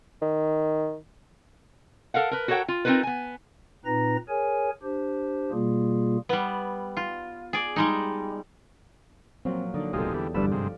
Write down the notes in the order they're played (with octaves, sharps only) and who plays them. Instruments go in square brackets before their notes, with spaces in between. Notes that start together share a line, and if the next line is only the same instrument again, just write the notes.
[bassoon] D#3
[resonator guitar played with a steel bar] A4 A#4 F5 F#5
A#4 B4
F#4 A4 A#4 C#5 F#5 G5
F4
C4 D#4 F4 A#4 B4
B3 G#5
[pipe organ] A#2 C4 D#4 B4 A#5 A#6
G#4 A#4 C#5 G#5
D4 G4 C5
B2 G3 A#3 F4 G#4
[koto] G3 B3
F4
G#4 D5
G3 G#3 D#4
[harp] A#2 F3 F#3 [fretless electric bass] C4
[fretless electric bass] D3 [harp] D#4 D5
[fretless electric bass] D1 C2 B2 [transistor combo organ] F3 G#3 D#4 [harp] G4 A4
[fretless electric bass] E2 [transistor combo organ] D3 E3 G3
[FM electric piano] G1 G2 [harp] F3 D5 [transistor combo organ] A3 B4 E6
[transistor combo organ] G#2 C3 [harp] F3